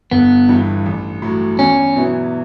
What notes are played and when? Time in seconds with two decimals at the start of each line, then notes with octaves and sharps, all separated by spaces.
0.11 G1 B3
0.49 G2 E3
0.86 A1
1.22 A2 F#3
1.59 E2 C#4
1.96 B2 F#3 B3 E4